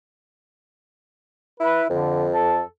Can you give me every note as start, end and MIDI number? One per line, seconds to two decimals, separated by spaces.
1.60 1.87 64
1.60 1.83 71
1.89 2.61 41
1.89 2.28 50
2.34 2.62 69